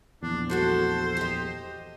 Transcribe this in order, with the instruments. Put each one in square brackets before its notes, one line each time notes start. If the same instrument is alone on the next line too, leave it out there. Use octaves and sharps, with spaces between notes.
[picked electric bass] A#1 E2 [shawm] D4
[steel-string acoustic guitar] A3 F#4 A4 [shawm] C5
[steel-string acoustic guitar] G4 D#5